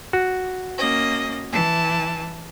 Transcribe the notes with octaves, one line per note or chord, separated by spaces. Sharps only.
F#4
A#3 C#4 D#5
E3 A5